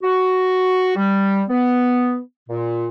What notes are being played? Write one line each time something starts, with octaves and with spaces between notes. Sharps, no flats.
F#4
G3
B3
A#2